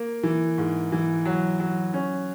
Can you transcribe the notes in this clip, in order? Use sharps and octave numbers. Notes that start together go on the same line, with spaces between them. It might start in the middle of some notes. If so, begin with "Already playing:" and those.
Already playing: A#3
E3
G#2
E3
F#3
F#3
C#4